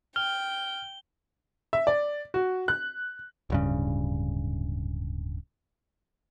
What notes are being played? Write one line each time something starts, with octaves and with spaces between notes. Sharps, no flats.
G5 F6 G7
E5
D5
F#4
F#6
D1 G2 C#3